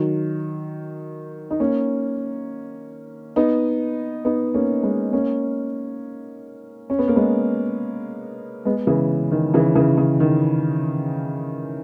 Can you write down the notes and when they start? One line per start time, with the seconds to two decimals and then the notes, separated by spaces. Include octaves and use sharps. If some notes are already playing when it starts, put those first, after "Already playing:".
Already playing: D#3 F#3
1.51 D#4
1.60 A#3 C#4
3.36 B3 D#4
4.25 B3 D#4
4.54 A#3 C#4
4.83 G#3 B3
5.13 A#3 C#4
6.90 C#4
6.99 B3
7.08 A#3
7.16 G#3 B3
8.65 G#3 B3
8.87 C#3 E3
9.32 D#3
9.54 C#3 E3
9.75 C#3 E3
9.97 C#3
10.20 D#3